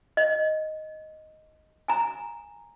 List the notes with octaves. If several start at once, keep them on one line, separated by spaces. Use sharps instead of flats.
D#5
G#5 A#5